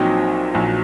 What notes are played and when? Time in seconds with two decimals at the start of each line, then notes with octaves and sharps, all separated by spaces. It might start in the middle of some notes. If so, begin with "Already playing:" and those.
Already playing: A#1 A#2 F#3 C4 D#4
0.54 A#1 A#2 F#3